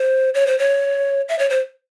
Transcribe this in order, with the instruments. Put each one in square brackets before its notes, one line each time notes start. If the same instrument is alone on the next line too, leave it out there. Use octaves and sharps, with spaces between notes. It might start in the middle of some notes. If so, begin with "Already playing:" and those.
Already playing: [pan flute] C5
C#5
C5
C#5
E5
C#5
C5